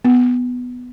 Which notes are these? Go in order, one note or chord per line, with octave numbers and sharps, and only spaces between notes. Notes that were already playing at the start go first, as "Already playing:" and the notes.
B3